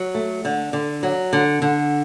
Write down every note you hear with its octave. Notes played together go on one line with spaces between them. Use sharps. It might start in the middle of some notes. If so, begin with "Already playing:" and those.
Already playing: F#3
A3
D3
D3
F#3
D3
D3